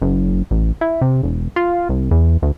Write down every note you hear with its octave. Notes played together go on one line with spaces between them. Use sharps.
F#1
A1
E4
C3
E1
F4
C2
E2
D2